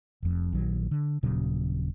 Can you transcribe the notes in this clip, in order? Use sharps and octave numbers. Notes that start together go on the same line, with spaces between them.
F1 F2
A#1 D#3 F#3
D3
D#1 A#2 C#3 F#3